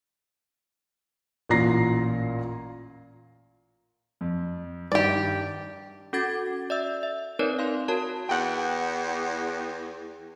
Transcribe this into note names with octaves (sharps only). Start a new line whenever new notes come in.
A1 A#2 F4 A#5 A#6 C7
F2
G2 D#3 G4 D5
C#4 F#4 A4 D6 G#6 A6
D5 E5 E6
E5
C4 D#4 A#4 B4 C#5 D5
F5 C6
F#4 A#4 C#5 A5
E2 F#5 G5